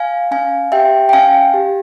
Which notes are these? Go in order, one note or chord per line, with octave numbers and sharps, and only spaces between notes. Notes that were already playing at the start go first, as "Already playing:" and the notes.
Already playing: F5 G#5
C#4 F5 G#5
G4 E5 G5
G5
C#4 F5 G#5
G4